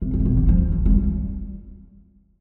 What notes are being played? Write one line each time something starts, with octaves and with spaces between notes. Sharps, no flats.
C3
B2
C3
B2
D3
F3
A3
F3
G3